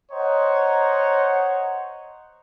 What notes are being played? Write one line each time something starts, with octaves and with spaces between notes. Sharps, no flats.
C5 C#5 D#5 F#5 A#5